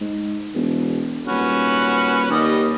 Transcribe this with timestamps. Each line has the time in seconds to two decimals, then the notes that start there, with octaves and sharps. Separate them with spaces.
0.01 G#2
0.54 E1
1.26 D#1 C#4 F#4 B4
2.30 D#2 G3 D#5